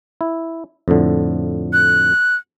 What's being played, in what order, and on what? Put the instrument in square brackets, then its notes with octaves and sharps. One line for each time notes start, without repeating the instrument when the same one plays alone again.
[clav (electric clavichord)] E4
F2 A2 D3
[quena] F#6